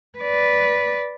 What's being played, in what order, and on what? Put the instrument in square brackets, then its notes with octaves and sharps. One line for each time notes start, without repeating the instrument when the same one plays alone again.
[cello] B4 D5